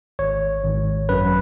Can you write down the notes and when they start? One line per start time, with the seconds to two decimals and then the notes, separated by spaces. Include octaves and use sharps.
0.19 G#1 C#5
0.64 G#1
1.09 F#2 B4